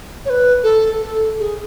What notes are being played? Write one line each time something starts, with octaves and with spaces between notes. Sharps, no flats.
C#5
B4
A4
A4
G#4